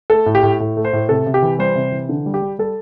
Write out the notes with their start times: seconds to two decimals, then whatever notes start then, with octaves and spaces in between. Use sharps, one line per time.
0.10 A3 A4
0.26 A2
0.35 G4
0.43 A2
0.60 A2
0.77 A3
0.85 C5
0.93 A2
1.09 C3 A4
1.26 C3
1.34 G4
1.42 E3
1.59 G3 C5
1.75 C3
1.92 E3
2.09 D3
2.26 G3
2.34 G4
2.42 G3
2.59 G3 A4